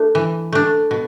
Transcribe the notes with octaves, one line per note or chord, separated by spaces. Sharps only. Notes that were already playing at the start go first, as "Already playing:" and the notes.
Already playing: A3 D4
E3
A3 D4
B2